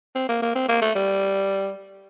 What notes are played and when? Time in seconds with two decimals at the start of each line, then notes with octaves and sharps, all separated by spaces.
0.15 C4
0.29 A#3
0.42 A#3
0.55 C4
0.69 A#3
0.81 A3
0.95 G3